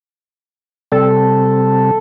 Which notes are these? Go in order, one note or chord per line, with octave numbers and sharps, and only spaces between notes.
C3 G3 C4 A4